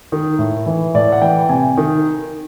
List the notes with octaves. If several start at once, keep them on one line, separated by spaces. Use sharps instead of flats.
D#3
A2
E3
A2 D5
F#5
E3 G5
C3 G#5
D#3